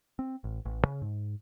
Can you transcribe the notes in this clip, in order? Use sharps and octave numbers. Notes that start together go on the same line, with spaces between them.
C4
A1
A1
C#3
G#2